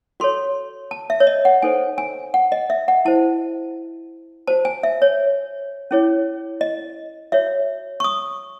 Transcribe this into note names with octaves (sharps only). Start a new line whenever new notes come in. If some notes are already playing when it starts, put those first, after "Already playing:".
F#4 A4 C#5 C6
A5
E5
C#5
D#5
F#5
D#4 A4 C5 G#5
G#5
F#5
D#5
E5
F#5
E4 C5 A5
F#4 C5 A5
G#5
E5
C#5
C#4 E4 G#4 C#5
D#5
F#4 C#5 E5
C#6
D#6